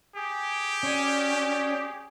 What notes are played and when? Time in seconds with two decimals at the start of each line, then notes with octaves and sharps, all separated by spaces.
0.16 G4 G#4
0.84 C#4 F#4 C#5 D5